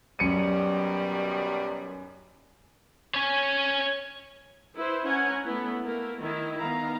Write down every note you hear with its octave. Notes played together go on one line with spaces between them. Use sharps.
F#2 B2 D#3 G3 C#7 D#7
C#4 C#5
E4 B4 C5
C#4 C#5 F#5 G#5 A#5
A3 B3 E4
A3 A#3 E4 A#4
D#3 E4
D#3 B3 F5 A#5